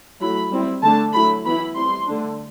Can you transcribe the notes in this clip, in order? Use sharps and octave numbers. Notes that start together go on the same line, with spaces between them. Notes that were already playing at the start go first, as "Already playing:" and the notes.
F#3 A3 E4 B5
G3 C4 E4
D3 A3 D4 A5
F#3 A3 E4 B5
E3 B3 E4 B5
G3 C4 E4 C6
D3 A3 D4